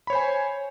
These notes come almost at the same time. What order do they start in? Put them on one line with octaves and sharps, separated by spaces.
B5 C#5 C5 G#5